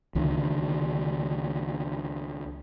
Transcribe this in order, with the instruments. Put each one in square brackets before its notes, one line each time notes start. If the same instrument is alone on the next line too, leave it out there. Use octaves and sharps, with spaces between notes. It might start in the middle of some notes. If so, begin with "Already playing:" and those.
[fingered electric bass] C#2 D3 D#3